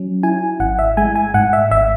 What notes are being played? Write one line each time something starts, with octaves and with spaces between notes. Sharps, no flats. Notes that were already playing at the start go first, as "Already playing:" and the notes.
Already playing: F#3 C#4
E4 G#5
G#1 F#5
E5
G#3 G#5
G#5
G#2 F#5
E5
G#1 E5